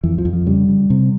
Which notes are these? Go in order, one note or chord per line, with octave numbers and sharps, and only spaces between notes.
F2 E3
F3
F2
F3
C#3 G3
C#3
C3